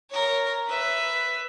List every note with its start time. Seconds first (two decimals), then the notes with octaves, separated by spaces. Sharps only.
0.10 A#4 C#5
0.67 B4 E5